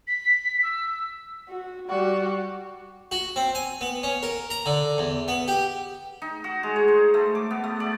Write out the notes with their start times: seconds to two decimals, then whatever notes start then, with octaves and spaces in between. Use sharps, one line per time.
0.07 B6
0.63 E6
1.49 F#4
1.89 G3 F#4
3.11 F#4
3.36 C4
3.55 G#5
3.81 B3
4.03 C#4
4.23 A#4
4.50 A#5
4.66 D3
4.98 E2
5.28 B3
5.48 G4
6.22 D#4
6.44 F#4
6.63 G#3
6.76 C#5
6.88 C5
7.14 A3
7.35 D6
7.51 B3
7.64 A3
7.80 D5